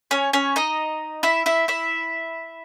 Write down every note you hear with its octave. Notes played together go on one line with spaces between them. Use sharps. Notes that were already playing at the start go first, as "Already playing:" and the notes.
C#4 C#5
C#4 C#5
D#4 D#5
E4 E5
E4 E5
E4 E5